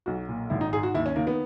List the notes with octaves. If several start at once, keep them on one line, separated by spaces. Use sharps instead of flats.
B1 F#4
A#2
G#1 E4
D#4
G#2 G#4
F#4
D#2 E4
C#4
D#3 A#3
B3